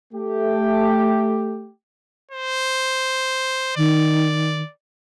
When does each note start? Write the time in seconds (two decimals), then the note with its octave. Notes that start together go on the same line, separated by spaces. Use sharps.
0.14 A3 G4
2.31 C5
3.77 D#3 D5